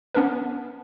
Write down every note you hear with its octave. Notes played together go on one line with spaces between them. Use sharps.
B3 C#4 D4 A#4 B4